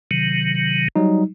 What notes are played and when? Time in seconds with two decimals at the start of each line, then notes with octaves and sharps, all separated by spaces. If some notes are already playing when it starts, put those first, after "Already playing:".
0.11 C3 D#3 F#3
0.96 F#3 G3 D#4